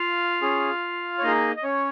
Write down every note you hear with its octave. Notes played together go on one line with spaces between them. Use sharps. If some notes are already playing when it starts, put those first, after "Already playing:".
Already playing: F4 F5
C#4 G#4
C#5
A#3 D#4 G#4 D#5
D#5
C#4 C#5